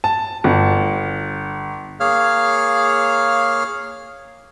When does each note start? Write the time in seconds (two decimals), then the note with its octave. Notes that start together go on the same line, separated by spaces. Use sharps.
0.04 A5
0.44 G1
2.00 A#3 G#4 C#5 F5 F6